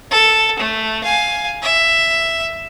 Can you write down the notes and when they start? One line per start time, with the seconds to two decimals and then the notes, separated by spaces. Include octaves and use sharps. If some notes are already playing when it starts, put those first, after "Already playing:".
0.11 A4
0.59 A3
1.04 F5 G#5
1.62 E5